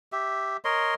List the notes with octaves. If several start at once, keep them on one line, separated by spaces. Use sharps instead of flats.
G4 E5
A#4 C#5 D#5 C6